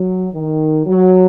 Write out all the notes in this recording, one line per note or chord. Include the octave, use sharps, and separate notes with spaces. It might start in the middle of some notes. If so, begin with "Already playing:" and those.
Already playing: F#3
D#3
F#3